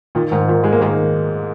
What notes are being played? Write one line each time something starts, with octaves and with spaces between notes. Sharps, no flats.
A#2 D#3
G#2 D#3
A#2 D#3
D#3 G#3
A#3
D#3 G#3